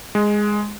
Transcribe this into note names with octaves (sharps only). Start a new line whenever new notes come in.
G#3